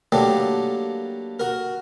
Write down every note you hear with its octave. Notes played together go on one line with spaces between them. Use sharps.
F#3 G3 A3 A#3 D4 G4
F#4 A#4